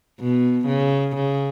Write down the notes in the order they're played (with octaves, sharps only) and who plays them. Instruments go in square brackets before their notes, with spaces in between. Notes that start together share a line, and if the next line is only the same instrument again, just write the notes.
[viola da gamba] B2
C#3
C#3